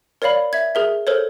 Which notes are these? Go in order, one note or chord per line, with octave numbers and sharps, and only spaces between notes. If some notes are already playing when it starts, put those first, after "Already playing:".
A#4 C#5 D5 F5 B5
E5 G#6
G#4 A#4 E5
A4 A#4 C5 C#5